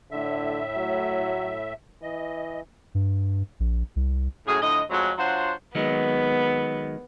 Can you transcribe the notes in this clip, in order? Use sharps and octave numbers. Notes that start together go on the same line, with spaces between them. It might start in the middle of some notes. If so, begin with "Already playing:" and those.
A2 D3 E5
F#3
E3 D#5
G2
A#1
C2
F#2 A2 C#4 G#4
A2 D3 F3 D#5
F2 F#3 G#3
F#3 D4 F4 C5 C#5 F#5
D#3 F#3 G#3 B3